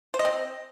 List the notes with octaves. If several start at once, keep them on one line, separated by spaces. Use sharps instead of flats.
C5
D#5
C4